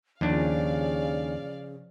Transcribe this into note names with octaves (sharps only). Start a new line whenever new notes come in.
D#2 C#3 F3 D4 D5 F5